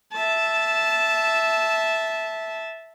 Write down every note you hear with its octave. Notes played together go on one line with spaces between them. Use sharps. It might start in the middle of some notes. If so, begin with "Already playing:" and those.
E5 A5